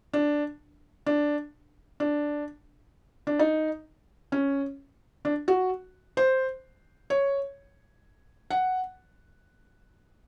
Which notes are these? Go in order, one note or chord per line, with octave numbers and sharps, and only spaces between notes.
D4
D4
D4
D4
D#4
C#4
D4
F#4
C5
C#5
F#5